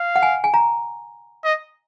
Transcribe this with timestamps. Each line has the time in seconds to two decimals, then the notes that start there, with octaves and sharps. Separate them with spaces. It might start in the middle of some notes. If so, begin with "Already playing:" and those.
Already playing: F5
0.16 F#5
0.23 G#5
0.44 G#5
0.54 A#5
1.45 D#5